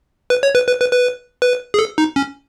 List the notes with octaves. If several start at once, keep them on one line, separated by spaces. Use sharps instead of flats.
B4
C#5
B4
B4
B4
B4
B4
G#4
A4
D#4
C#4